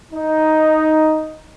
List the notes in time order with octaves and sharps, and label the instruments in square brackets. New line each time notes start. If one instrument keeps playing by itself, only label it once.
[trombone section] D#4